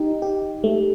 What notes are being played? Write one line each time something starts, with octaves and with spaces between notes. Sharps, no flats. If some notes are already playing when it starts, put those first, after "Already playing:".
Already playing: D#4 G4
G4
A3